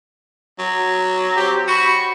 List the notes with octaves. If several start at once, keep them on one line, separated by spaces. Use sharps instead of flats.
F#3
C4 G4
F#4 B5 C#6